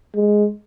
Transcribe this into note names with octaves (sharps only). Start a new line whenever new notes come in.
G#3